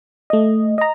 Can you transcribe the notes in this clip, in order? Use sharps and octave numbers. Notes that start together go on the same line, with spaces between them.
A3 D#5
D#5 A#5